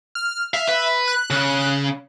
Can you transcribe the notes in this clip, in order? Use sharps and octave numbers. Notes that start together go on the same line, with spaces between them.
F6
E5 F5
B4
F#6
C#3